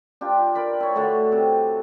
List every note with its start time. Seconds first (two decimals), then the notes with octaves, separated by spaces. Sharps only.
0.21 D4 F4 G4
0.55 A#4 D5 B5
0.80 E4 C#5
0.95 D3 A3 F#4 A4
1.32 C3